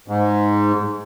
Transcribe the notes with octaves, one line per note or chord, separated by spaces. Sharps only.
G#2